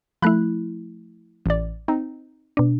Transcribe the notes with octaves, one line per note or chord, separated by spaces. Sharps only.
F3 A3 E4 B5 F#6
A1 D5
C4 D#4
B2 D4